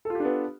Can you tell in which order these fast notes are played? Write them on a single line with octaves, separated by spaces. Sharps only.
A4 F4 G4 D4 B3